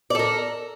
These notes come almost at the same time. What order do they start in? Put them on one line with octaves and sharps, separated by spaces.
D5 A4 A#4